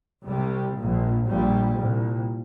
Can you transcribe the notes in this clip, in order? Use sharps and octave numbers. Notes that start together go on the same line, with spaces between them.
C2 C3 G3
A#1 A#2
A#1 A#2 G3
C2 A#2